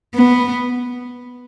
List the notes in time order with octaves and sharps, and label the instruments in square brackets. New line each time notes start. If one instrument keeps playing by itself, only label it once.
[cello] B3